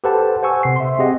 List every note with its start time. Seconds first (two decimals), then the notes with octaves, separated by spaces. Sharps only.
0.04 G4 A4 B4 C5 F#5 A5
0.43 C5 F#5 G#5 C#6 E6
0.63 C3 C7
0.76 E5 C6
0.99 C4 G4 G#4 D#5 F#5